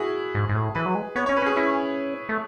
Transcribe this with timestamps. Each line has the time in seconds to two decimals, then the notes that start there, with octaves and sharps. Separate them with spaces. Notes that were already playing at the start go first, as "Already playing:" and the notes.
Already playing: E4 F#4 G#4
0.35 G#2
0.49 G#2
0.55 A2
0.75 E3 B4
0.86 F#3
0.95 G#3
1.15 B3 C#5
1.26 C#4 C#5
1.36 B4
1.42 C#4 G#4
1.56 C#4 E4
2.29 A3